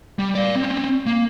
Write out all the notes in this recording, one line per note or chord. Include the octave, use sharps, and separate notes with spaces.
G3
D5 F5
C4 C#4
A#3